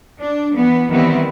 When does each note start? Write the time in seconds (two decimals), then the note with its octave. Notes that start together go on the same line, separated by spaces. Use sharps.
0.19 D4
0.56 E3 B3
0.89 D#3 E3 G3 B3 C4 E4